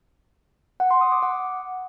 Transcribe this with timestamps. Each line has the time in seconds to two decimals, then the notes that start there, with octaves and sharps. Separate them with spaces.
0.80 F#5
0.91 C6
1.01 D#6
1.12 D6
1.23 F#5